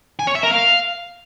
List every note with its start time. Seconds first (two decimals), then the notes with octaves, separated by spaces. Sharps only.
0.19 G#5
0.27 C#5
0.35 E5
0.43 A#4
0.51 F5